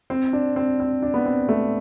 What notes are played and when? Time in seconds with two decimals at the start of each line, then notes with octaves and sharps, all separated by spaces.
0.10 C4
0.33 D4
0.56 C4
0.80 C4
1.02 D4
1.14 B3
1.26 C4
1.49 A3